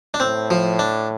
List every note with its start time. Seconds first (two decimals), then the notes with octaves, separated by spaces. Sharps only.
0.14 D4
0.20 A2 C4
0.50 F3
0.79 D4